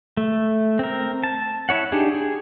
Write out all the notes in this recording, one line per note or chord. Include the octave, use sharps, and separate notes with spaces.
A3
C4 A#4
A5
E4 C#5 F#5
D4 D#4 G4 G#4
G#4